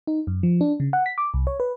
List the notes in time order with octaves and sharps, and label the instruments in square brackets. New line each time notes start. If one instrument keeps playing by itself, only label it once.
[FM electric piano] D#4
F#2
F3
D4
C#3
F#5
B6
D6
C2
C#5
B4